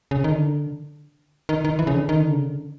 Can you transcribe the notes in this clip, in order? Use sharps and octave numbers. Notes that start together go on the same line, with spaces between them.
C#3
D#3
D3
D#3
D#3
E3
C#3
D3
D#3
D3
C#3
D3